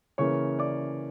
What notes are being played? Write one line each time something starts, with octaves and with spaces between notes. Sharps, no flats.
C#3 E3 A#3 C#5 C#6
D5 D6